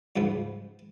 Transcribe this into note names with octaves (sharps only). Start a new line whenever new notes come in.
C#2 G#2 F3 B4